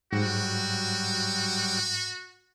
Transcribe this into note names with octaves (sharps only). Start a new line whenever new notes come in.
G#2 F#3 G3 F#4